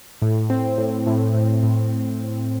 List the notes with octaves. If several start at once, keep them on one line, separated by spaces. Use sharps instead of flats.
A2
C4
A2
A2
A2
A2